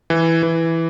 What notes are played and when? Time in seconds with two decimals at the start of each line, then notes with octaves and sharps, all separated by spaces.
0.10 E3
0.43 E3